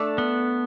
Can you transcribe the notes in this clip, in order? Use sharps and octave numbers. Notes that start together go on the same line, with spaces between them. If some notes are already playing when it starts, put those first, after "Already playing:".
Already playing: A3 D4 A4
B3